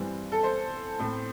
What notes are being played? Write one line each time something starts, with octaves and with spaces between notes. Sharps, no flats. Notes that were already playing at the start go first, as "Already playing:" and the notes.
Already playing: G2 E3 G3 C4
A4
C5
A2 A3 C4